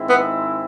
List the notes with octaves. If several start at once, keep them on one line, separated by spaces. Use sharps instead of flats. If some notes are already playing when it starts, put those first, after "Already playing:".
Already playing: G#2 D#3 G#3 C4 E4
B3